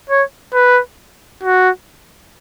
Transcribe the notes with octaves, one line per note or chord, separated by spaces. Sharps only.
C#5
B4
F#4